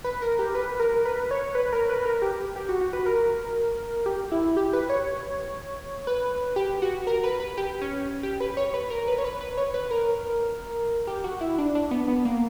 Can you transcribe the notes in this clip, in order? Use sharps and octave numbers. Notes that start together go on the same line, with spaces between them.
B4
A#4
G4
B4
A#4
B4
C#5
B4
A#4
B4
A#4
G4
G4
F#4
F#4
B4
A#4
G4
E4
G4
B4
C#5
B4
G4
F#4
A#4
B4
B4
G4
C#4
G4
B4
C#5
B4
A#4
B4
C#5
B4
B4
C#5
B4
A#4
G4
F#4
E4
D4
D4
B3
B3
A#3